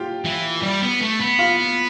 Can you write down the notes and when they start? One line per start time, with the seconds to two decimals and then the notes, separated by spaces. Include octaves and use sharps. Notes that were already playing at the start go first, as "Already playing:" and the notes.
Already playing: F4 G4 G5
0.25 E3
0.63 G3
0.82 B3
1.01 A3
1.20 B3
1.39 F4 F5